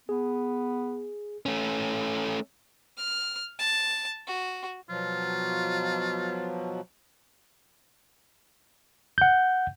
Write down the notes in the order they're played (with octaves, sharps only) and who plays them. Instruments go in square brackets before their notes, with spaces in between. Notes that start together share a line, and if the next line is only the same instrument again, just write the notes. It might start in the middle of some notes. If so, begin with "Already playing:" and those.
[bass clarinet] B3 [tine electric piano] G#4
[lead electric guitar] A3 C#4
[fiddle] F6
A5
F#4
[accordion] B2 F3 F#3 [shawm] F4
[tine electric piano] F#5 G6